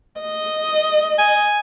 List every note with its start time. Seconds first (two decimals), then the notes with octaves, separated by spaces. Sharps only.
0.21 D#5
1.18 G#5